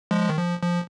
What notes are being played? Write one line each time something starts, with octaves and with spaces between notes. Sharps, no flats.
F3 G#3
D#3
F3
F3